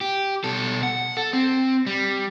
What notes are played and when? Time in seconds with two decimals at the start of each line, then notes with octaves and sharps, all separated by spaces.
0.01 G4
0.44 B2 A4
0.83 F#5
1.17 A4
1.33 C4
1.87 G3